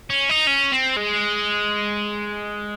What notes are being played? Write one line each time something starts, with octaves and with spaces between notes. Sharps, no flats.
C#4
D#4
C#4
C4
G#3